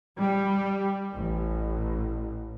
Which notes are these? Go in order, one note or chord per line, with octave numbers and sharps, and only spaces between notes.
G3
A1